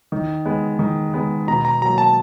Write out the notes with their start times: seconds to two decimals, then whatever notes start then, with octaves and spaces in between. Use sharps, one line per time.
0.12 D#3
0.45 G#3 B3
0.79 D#3
1.14 G#3 B3
1.47 B2 A#5
1.65 A#5
1.81 F#3 A#3 A#5
1.98 A5